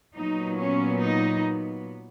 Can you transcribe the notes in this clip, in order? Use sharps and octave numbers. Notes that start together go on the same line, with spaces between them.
A#2 F#3 B3 D#4
C#4
D#4